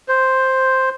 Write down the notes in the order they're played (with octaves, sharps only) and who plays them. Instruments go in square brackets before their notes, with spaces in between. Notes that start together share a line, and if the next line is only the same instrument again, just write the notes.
[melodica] C5